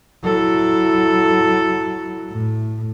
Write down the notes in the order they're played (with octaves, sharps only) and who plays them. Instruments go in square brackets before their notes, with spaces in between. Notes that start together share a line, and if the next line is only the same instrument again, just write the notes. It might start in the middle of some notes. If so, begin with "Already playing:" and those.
[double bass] F#3 E4 [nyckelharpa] A4
[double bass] A2